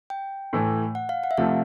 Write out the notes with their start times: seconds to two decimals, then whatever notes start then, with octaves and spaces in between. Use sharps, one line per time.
0.10 G5
0.53 A2 E3 A3
0.95 F#5
1.09 F5
1.24 F#5
1.31 E5
1.37 C3 F3 A3 F5